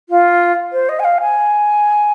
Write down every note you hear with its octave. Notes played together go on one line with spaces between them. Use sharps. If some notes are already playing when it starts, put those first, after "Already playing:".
F4
C5
D#5
G#5
F5
G#5